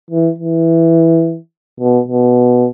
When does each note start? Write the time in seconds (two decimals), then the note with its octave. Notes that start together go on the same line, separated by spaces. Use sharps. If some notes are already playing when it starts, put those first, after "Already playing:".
0.11 E3
0.38 E3
1.80 B2
2.08 B2